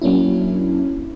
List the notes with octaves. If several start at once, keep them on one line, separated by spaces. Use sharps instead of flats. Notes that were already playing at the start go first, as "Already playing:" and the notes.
F#3 A#3 C#4 D4 E4